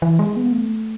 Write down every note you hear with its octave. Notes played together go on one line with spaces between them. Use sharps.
E3
G#3
B3
A3